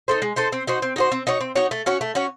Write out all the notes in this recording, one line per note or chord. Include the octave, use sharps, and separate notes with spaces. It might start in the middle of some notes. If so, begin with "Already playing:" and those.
D#4 A4 C5
G#3
D#4 A4 C5
C4
D#4 F#4 C5
C4
D#4 F#4 C5
C4
D#4 F#4 C#5
C4
D#4 F#4 C#5
A3
C#4 F#4 C#5
A3
C#4 F#4 C#5